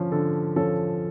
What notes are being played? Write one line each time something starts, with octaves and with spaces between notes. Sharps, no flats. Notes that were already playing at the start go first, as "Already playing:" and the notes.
Already playing: D3 F3 C#4
D3 A4
F3 C#4 A4